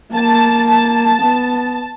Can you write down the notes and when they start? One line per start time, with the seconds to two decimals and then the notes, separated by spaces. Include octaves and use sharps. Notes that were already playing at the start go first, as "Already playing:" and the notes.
0.14 A#3 A5
0.68 A5
1.22 B3